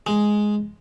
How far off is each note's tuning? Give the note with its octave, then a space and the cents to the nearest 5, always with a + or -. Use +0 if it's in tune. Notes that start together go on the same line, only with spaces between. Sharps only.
G#3 +5